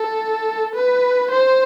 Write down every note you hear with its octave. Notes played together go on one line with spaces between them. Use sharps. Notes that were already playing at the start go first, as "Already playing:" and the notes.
Already playing: A4
B4
C5